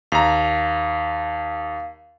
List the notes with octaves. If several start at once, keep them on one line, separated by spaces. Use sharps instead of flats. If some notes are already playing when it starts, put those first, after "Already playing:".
D#2 F5 A#5